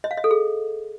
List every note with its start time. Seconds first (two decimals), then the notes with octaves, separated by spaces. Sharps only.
0.04 D#5
0.11 F5
0.17 D#5
0.24 A4
0.31 G#4